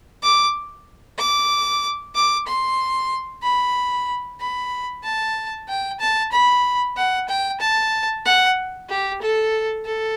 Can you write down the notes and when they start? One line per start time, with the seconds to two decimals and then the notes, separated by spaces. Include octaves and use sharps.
0.23 D6
1.19 D6
2.15 D6
2.47 C6
3.43 B5
4.40 B5
5.04 A5
5.69 G5
6.00 A5
6.32 B5
6.96 F#5
7.28 G5
7.60 A5
8.25 F#5
8.89 G4
9.22 A4
9.85 A4